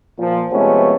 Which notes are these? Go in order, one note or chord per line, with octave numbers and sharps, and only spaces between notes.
A#2 F3
C3 F3 G#3 A3 B3 C#4